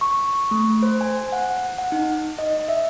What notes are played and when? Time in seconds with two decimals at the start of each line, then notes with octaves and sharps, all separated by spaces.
0.01 C#6
0.51 A3
0.83 C5
1.01 G#5
1.33 F#5
1.78 F#5
1.92 D#4
2.38 D#5
2.68 E5